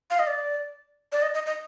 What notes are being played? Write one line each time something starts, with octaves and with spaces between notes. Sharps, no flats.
F5
D#5
D5
D5
D#5
D#5
D#5